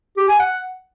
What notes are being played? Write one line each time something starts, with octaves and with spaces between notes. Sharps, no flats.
G4
G#5
F#5